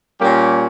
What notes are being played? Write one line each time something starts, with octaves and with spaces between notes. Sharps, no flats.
A#2 G3 A#3 C#4 G4